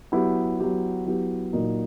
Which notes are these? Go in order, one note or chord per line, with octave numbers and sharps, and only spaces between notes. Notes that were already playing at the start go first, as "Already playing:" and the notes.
F#3 B3 E4 G4
F#3 B3 E4 G4
F#3 B3 E4 G4
A#2 F#3 A#3 D#4 F#4